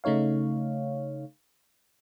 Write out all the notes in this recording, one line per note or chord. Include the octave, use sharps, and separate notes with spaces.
C#3 A3 D#4 C#5 F5